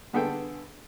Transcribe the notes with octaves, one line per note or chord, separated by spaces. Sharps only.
G2 D3 B3 G#4 A4 G5